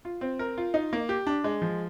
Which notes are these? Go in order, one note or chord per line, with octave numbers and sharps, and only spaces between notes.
F4
C4
A#4
F4
D#4
A#3
G4
D4
G#3
F3